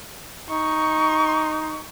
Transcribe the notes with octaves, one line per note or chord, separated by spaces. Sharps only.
D#4 C#6